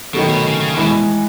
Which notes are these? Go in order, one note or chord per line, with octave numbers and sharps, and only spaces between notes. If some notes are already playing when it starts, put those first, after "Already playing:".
B2 D#3 F#3 A3
B2
C#3
C#3
B2 E3 G#3